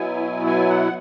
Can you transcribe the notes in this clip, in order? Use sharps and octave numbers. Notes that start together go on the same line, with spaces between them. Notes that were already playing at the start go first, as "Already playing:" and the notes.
Already playing: B2 F#3 B3 E4 G#5
G#5
F#5